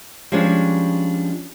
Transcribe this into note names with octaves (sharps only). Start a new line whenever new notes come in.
F3 G3 G#3 C#4 D4